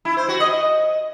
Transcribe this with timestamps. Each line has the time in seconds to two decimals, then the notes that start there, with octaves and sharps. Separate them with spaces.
0.05 E4
0.17 C5
0.28 F#4
0.40 D#5